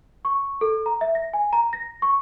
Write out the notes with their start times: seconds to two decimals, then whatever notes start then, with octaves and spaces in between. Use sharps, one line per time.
0.25 C#6
0.61 A4
0.86 A#5
1.01 E5
1.15 A#6
1.33 G#5
1.53 A#5
1.73 A#6
2.02 C#6